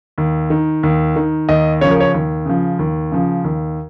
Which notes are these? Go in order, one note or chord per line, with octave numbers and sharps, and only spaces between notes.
D#2
D#3
D#2
D#3
D#2 D#5
C#3 F3 C#5
A#4
C#5
D#2
C#3 F3
D#2
C#3 F3
D#2